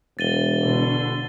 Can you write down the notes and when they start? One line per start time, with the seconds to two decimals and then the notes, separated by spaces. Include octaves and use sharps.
0.19 E1 A6 D#7 G7
0.62 B2 D3